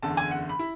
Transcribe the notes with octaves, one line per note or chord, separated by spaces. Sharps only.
F#1 E2 D3 A5
G#5
F#5
B5
E4